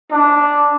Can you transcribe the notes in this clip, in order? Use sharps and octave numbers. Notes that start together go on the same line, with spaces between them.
D4